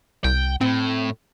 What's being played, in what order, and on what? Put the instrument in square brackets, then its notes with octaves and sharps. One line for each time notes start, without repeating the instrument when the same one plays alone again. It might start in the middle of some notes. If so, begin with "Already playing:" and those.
[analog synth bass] C2 [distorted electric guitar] G5
[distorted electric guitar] A2 [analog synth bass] C4